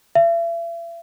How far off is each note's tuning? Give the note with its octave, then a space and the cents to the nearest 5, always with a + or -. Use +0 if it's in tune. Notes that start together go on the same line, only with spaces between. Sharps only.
E5 +40